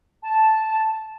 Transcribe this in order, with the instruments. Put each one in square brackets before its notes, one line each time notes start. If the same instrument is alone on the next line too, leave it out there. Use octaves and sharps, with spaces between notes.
[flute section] A5